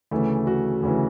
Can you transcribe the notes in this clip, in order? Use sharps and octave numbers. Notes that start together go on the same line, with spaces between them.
D2 C#3 E3 A3
F#4
D2 C#3 E3